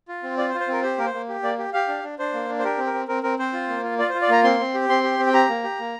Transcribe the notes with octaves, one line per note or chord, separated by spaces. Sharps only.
F4
C4
F4 D5
C5
F4
C5
C4 A#4
G4 C5
A#3 A#4
C5
A#3
G4
A#3 D5
G4
G4 F5
D4
D4
D4 C5
A#3
D4
C5
G4 A#4
C4
A#4
C4
C4 A#4
C4 A#4
C4 C5
F4
A#3
F4
F4 D5
C5
F4
D5
A#3 A#5
C4 C6
C4
G4
C4 C6
G4
C4
G5
G4 A#5
A#3
G4
A#3